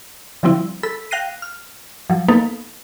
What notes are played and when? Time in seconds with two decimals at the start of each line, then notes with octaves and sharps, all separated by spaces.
0.43 D3 F3 G3 C4 E4
0.83 A4 B5 E6 B6
1.11 F5 G5 F#6 A#6 C7 D#7
1.42 F6
2.10 F3 F#3
2.28 A#3 B3 D#4 A4 B4 F5